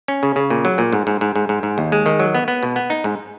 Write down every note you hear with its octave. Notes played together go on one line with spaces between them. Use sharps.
C#4
C#3
C#3
A#2
F#3
A#2
G#2
G#2
G#2
G#2
G#2
G#2
D#2
G#3
D#3
F#3
B3
B3
B2
B3
D#4
G#2